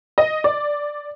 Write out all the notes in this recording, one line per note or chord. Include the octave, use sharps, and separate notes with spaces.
D#5
D5